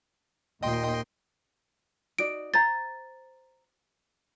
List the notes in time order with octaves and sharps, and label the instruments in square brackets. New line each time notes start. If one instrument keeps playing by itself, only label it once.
[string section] D#2 A#2 [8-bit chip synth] D#5 G5 C6
[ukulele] D#4 F#4 D5 [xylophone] D7
[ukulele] C5 A#5 [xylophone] A6